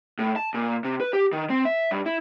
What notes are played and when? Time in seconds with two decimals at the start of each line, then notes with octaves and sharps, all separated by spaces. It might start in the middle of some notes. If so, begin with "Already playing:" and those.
0.19 A2
0.36 A5
0.54 A#2
0.84 C3
1.00 B4
1.13 G4
1.33 D#3
1.50 C4
1.65 E5
1.91 G2
2.06 E4